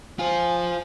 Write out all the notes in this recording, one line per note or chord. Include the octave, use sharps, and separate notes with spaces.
F4 C5 G#5